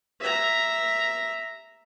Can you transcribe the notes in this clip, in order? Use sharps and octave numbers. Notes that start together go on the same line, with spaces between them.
E5 A#5